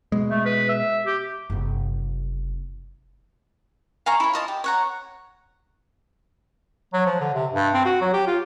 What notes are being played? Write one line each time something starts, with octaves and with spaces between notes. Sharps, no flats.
B2 G#3
A3
B4
E5
G4
F#1 C3
F5 G#5 A#5 C#6
E4 C#5
F4 D#5 A5
G4
C#5 F#5 A#5
F#3
F3
D3
C3
G2
C4
F#4
F#3
G4
F4